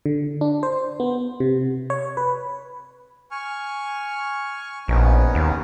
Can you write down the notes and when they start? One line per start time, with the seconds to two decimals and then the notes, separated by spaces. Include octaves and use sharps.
0.06 D3
0.41 D4
0.63 C5
1.00 B3
1.40 C3
1.90 C#5
2.17 B4
3.31 G#5 C#6 F6
4.88 A#1 B3 C#4 D#4
5.35 D#2